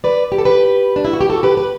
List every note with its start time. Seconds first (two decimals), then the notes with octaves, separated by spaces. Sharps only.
0.04 B4 D5
0.32 G4
0.38 A4
0.45 G4 B4
0.96 D4
1.05 E4
1.13 F#4
1.21 G4
1.30 F#4 A4
1.43 G4 B4
1.57 G4 B4